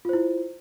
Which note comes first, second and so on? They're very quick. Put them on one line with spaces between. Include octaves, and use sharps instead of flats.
F4 C5 E4